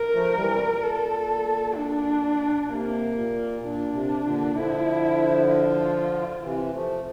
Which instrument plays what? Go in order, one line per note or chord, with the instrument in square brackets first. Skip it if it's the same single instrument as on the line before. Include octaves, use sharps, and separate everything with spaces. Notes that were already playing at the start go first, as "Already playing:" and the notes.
Already playing: [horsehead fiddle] A#4
[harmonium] F3 A3
E3 G3
C3
A#2
[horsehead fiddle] A4
D4
[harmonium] C3 [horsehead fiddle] A#3
[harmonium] A#2
[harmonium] A#2 [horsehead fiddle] D4
[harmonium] C3
A#2 D3
[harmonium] D3 F3 [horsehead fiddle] E4
[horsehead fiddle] F4
[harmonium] C3 E3
F3 A3